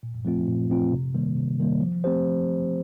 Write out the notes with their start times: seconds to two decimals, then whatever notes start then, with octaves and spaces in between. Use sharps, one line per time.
0.03 A#2
0.25 F3 A3 C4 F4
0.47 A#2
0.70 F3 A3 C4 F4
0.92 C3
1.14 D#3 G3 A#3
1.37 C3
1.60 D#3 G3 A#3
1.81 F3
2.04 A3 C4 G4 C5
2.26 F3